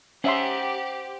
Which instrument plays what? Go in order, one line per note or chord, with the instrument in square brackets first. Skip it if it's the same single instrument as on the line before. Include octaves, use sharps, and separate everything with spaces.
[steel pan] C#4 E5 C6 [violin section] G4 [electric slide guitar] C5 F#5